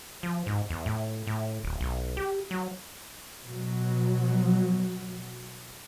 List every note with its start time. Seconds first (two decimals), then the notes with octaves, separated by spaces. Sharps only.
0.23 F3
0.46 G#2
0.70 E2
0.86 A2
1.27 A2
1.63 D1
1.81 B1
2.17 G4
2.51 F#3
3.44 B2 F#3